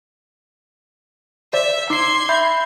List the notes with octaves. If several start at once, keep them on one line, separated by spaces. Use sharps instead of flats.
C5 D5 E5
D#4 C6 D6 G#6 C7
E5 B5 G6